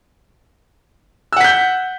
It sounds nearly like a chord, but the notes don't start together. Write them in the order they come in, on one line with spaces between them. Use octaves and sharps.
E6 F#5 B6 G6